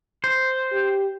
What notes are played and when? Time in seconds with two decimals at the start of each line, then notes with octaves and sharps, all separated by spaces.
0.24 C5
0.73 G4